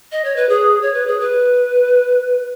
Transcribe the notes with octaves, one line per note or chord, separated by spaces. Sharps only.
D#5
C#5
B4
G#4
C#5
B4
G#4
B4